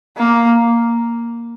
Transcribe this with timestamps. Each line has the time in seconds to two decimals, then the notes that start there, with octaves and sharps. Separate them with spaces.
0.17 A#3